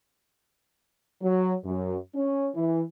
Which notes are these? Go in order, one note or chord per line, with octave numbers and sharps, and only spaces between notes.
F#3
F#2
C#4
E3